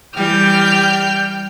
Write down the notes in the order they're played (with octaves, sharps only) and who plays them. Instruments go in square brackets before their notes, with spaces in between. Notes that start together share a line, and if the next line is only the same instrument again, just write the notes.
[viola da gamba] E3 G3 [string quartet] G5 F6 G6